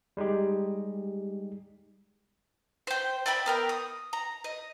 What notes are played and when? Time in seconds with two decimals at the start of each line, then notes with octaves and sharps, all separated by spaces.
0.17 G3 G#3 D#4 G4
2.87 C5 G5
3.26 D5 E5 G5 B5
3.46 B3 A#4 G5
3.69 D#6
4.13 A#5
4.44 D#5